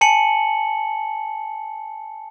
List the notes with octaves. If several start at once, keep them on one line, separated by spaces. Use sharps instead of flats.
G#5 A5 C#7 F#7